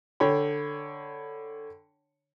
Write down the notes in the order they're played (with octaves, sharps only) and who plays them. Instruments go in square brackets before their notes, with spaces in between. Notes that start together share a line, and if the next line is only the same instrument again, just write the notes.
[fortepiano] D3 C#5 G5 B5